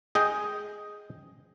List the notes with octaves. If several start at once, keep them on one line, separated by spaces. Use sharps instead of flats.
G#4 D#5 G5